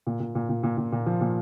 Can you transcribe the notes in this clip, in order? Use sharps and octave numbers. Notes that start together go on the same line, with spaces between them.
A#2
A#2
A#2
A#2
A#2
A#2
A#2
F3
A#2